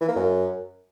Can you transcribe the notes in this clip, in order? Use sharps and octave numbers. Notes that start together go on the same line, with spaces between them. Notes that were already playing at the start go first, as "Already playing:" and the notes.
E3
A#3
F#2